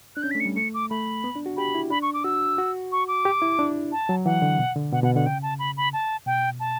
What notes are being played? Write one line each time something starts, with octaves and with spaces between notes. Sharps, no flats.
D4 F#6
C#4 G6
B6
A3
C#7
G3
A3 C#7
D6
A3 B5
B3
D4
F#4
G4 B5
E4
D4 B5
C#6
D6
F#4 E6
F#4
C#6
D6
G4
E4
D4
A5
F#3
E3 F#5
D3
B2
D3
B2 F#5
B2 F#5
D3 F#5
C#3 G5
A5
B5
B5
A5
B2 G5
A5